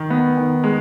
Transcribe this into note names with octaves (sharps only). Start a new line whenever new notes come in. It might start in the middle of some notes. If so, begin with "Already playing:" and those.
Already playing: D#3
B3
D#3
G#3